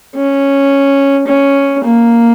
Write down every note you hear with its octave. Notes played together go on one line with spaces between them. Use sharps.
C#4
C#4
A#3